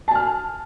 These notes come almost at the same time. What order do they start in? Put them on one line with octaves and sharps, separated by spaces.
A5 G#5 F6